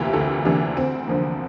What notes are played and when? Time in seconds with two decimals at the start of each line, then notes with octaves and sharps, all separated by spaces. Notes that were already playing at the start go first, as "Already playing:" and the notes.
Already playing: D2 C3 E3 A#3 E4 F4 G4
0.13 D2 A4
0.45 C3 E3 A#3 D4
0.77 D2 C4
1.07 D3 F3 A#3